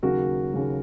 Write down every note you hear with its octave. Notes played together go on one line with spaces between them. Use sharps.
D#2 C#3 F#3 A#3 F#4 A#4
D#2 C#3 F#3 A#3